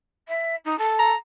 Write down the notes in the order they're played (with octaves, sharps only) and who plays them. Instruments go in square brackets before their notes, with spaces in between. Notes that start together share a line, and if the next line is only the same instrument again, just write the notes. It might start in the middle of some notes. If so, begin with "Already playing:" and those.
[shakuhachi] E5
D#4
A4
[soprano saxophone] A#5